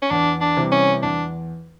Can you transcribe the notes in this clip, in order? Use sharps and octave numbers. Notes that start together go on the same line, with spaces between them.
C#4
E2 D4
D4
C3 E3 G3
C#4
E2 D4